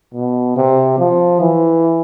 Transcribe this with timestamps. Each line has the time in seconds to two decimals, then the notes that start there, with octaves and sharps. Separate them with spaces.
0.14 B2
0.57 C3
0.99 F3
1.41 E3